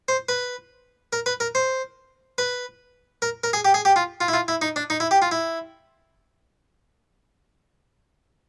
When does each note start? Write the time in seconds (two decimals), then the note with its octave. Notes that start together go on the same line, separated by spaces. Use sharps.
0.08 C5
0.29 B4
1.13 A#4
1.26 B4
1.40 A#4
1.55 C5
2.38 B4
3.22 A#4
3.44 A#4
3.53 G#4
3.65 G4
3.74 G#4
3.85 G4
3.96 F4
4.21 F4
4.28 E4
4.33 F4
4.48 E4
4.62 D#4
4.76 D4
4.90 D#4
5.00 E4
5.11 G4
5.22 F4
5.32 E4